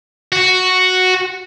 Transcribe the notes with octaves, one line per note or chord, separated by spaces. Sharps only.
F#4